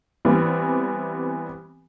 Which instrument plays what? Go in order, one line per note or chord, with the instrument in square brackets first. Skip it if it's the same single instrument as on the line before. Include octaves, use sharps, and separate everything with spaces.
[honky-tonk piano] E3 G3 B3 C4